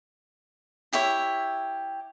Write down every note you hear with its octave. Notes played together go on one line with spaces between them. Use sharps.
E4 G4 C#5 E5